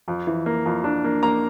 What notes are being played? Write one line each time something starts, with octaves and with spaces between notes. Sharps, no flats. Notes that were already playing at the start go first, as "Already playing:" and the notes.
F2
E3
A#3
F2
D4
A#3
A#3 A#5